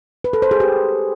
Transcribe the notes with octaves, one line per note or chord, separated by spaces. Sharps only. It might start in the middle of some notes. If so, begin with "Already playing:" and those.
B4
A4
C5
G#4
G4